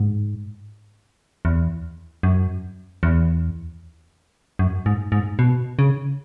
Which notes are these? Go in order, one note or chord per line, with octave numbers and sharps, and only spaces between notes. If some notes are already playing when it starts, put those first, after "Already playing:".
Already playing: G#2
E2
F#2
E2
F#2
G#2
G#2
B2
C#3